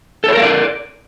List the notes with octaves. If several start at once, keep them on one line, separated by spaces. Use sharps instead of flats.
A4 A#4 C#5 D5 F5